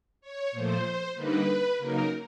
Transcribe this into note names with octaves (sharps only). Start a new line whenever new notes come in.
C#5
A#2 F3 A3 C5
D3 G3 A#3 D#4 B4
C#3 F#3 A#3 D#4 A#4